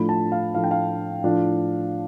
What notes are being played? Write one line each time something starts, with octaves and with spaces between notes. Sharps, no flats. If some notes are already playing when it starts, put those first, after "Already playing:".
Already playing: A2 F3 A3 D4 F4 B5
A5
F5
A2 F3 A3 D4 F4 F5
G5
F5
A2 F3 A3 D4 F4